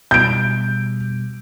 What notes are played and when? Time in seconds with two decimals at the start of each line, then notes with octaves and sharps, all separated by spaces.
0.11 B2 G3 G6 D7